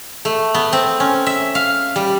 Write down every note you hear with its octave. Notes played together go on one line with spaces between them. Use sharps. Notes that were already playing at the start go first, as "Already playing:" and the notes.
A3
B3
C4
C#4
E5
F5
G3